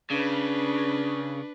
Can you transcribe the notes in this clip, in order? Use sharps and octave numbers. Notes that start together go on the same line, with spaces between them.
C#3 D4 B4